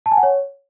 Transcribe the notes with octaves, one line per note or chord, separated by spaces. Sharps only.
A5
G#5
F#5
C#5